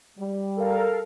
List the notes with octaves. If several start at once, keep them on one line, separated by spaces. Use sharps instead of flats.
G3
A4 A#4 F5